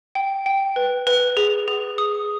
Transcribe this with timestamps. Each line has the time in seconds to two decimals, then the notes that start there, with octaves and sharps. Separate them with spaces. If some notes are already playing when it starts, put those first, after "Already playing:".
0.15 G5
0.46 G5
0.76 B4
1.07 B4
1.37 G#4
1.68 G#4
1.98 D#6